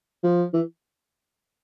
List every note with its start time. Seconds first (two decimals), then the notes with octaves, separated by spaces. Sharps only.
0.23 F3
0.54 E3